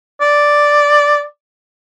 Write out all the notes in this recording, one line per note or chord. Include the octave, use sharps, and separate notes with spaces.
D5